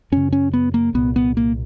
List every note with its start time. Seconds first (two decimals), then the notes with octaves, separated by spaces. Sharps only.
0.12 F#2 C#3 C#4
0.33 C#4
0.53 B3
0.74 A#3
0.94 C2 A#2 B3
1.16 B3
1.37 A#3